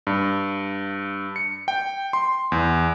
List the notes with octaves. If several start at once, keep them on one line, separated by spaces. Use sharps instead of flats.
G2
C#7
G5
C6
E2